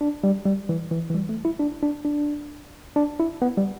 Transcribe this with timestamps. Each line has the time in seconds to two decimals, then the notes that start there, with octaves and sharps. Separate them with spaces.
0.01 D4
0.24 G3
0.45 G3
0.69 E3
0.91 E3
1.10 E3
1.14 G3
1.29 A3
1.45 E4
1.60 D4
1.83 D4
2.05 D4
2.96 D4
3.20 E4
3.42 B3
3.58 G3